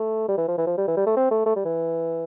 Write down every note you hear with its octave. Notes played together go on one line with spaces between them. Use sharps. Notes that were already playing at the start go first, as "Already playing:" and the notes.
Already playing: A3
G3
E3
F3
E3
F3
G3
E3
G3
A3
C4
A3
A3
G3
E3